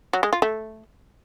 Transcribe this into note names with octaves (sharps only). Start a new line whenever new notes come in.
F#3
G#3
F4
A3